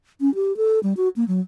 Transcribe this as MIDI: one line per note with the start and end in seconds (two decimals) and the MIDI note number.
0.21 0.33 61
0.35 0.56 67
0.57 0.79 69
0.83 0.93 55
0.97 1.09 66
1.16 1.24 58
1.28 1.40 54